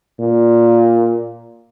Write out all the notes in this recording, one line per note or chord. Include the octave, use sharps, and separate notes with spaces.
A#2